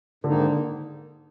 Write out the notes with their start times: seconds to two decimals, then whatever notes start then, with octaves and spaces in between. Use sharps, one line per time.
0.24 G#2 D3 D#3 A#3 D#4